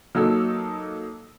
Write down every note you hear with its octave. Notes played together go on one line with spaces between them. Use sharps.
F#3 A#3 D#4 A4 E6